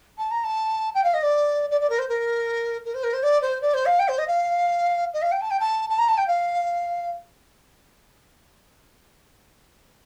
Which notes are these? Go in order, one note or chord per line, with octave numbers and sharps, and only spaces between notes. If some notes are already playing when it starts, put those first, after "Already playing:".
A5
A#5
A5
G5
F5
D#5
D5
D5
D5
A#4
C5
A#4
A#4
C5
A#4
C5
D5
C5
D5
C5
F5
G5
C5
D#5
F5
D#5
F5
G5
A5
G5
A5
A5
A#5
A5
G5
F5